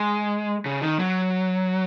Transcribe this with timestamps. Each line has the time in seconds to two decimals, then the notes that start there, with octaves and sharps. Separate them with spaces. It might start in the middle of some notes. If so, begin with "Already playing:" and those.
Already playing: G#3
0.66 C#3
0.82 D#3
0.99 F#3